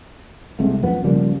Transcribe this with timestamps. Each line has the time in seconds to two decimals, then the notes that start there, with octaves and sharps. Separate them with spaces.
0.59 C2 C3 G#3 A3
0.82 F#2 F3 B3
1.04 C#3 F3 G3 A#3